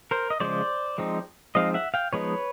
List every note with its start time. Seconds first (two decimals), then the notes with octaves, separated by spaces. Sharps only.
0.11 A#4 C5
0.30 D#5
0.40 C#3 F3 G#3 C5 D5
0.98 F3 G#3 C4 D#4
1.55 F3 G#3 C4 D#4 D#5 F5
1.74 E5 F#5
1.94 F5 G5
2.13 F3 G#3 B3 D#4 B4 C#5